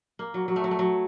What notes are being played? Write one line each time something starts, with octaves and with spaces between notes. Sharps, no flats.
A#3
F#3
F#3
A3
F#3
A3
F#3